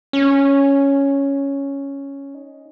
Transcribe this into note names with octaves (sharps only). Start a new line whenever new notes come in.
C#4
D#4